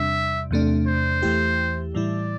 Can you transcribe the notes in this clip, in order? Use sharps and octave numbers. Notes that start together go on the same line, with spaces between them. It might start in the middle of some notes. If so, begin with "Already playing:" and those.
Already playing: E2 C3 G3 D4 E5
E2 C3 A3 D4
C5
E2 E3 A3 E4 G4
A2 E3 G3 E4 D5